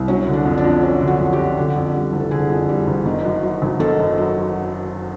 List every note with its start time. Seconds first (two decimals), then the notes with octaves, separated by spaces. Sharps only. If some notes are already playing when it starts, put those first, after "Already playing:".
Already playing: C2
0.08 F#3 C#4
0.27 D3
0.33 D4
0.46 F2
0.58 D4
0.64 F2
0.83 F#3 C#4
1.01 D3
1.08 F#4
1.20 F2
1.33 G4
1.39 F2
1.58 D3
1.76 F2
1.94 G3
2.13 F#1
2.20 A4
2.31 D3 G#4
2.50 F2
2.69 G3
2.87 F#1
3.06 D#3
3.25 F#2
3.43 F#3
3.62 G#1
3.80 D#3 A4
3.99 F#2
4.17 F#3